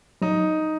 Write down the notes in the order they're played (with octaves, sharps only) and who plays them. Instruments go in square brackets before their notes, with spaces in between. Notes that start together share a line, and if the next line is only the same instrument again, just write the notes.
[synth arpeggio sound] F#3 [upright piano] D#4